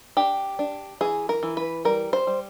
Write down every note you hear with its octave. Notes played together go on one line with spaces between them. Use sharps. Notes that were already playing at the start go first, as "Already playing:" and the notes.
D4 G4
D4
E3 G#4
A#4
E3
B4
G3 A#4
C5
G3